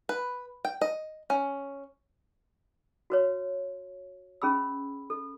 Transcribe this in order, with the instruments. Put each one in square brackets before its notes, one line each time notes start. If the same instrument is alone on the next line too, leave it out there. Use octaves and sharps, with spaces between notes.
[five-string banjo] B4
G5
D#5
C#4
[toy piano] F#4 B4 C#5
C#4 G#4 B5 E6
A4